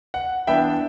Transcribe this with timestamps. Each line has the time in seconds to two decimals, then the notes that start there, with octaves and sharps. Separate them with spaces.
0.14 F#5
0.47 E3 B3 D4 E5 G5